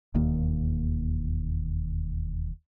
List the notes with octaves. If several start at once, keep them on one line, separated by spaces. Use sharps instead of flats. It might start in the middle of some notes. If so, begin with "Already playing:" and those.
E1 D#2 D#3 A#3